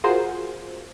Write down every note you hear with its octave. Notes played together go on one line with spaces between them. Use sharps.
F4 F#4 G#4 A#4 C5